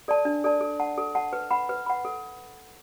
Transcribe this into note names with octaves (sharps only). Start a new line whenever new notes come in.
A4 D5 A5
D4
A4 D5 A5
A4
F#5 A5
A4
F#5 A5
B4
F#5 B5
B4
F#5 B5
A4